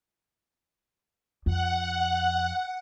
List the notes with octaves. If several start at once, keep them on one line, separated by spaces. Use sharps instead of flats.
F2 F#5